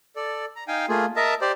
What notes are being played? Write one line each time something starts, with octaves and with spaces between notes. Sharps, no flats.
A4 D5
A#5
D#4 F5 G5 G#5
A3 A#3 F4 G#4
A#4 D#5 E5 A5
G4 C5 D5